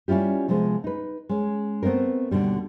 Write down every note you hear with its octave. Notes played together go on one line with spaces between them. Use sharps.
G3 C#4 E4 F4 G4
C3 F3 G#3 B3
D#4 B4
G#3 C#4
A3 B3 C4 D#4 A#4
D#2 B2 D3 G3